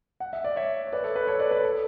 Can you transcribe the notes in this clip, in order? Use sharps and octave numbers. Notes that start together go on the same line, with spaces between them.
F#5
E5
D5
C#5 E5
C#5
B4 D5
A4 C#5
B4
A4 C#5
B4 D5
B4 D5
A4